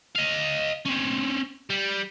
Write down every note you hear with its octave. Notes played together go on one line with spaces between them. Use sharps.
D#5 F5
C4 C#4
G3